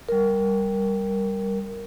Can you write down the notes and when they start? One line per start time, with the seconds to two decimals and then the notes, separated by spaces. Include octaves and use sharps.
0.09 G3 A#4